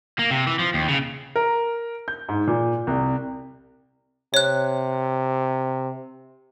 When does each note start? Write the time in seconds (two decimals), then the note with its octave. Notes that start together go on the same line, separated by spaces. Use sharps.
0.19 A#3
0.31 C3
0.47 E3
0.59 F3
0.74 D#2
0.88 C#3
1.36 A#4
2.08 G6
2.29 G#2
2.47 A#2
2.87 C2
4.34 C3 C#5 F#6